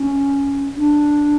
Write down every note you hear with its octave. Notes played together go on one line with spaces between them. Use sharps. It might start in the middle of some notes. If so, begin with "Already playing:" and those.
Already playing: C#4
D4